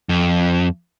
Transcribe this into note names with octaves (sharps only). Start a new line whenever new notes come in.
F2